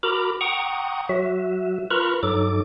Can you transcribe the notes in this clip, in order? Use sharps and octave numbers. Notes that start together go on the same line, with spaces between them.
F#4 A#4 A#5 B5 D6
F#5 G5 A#5 C#6 D#6
F#3 F#4 E5
F4 A#4 B4 A#5 B5 C#6
G2 F#3 D#4 A4 D6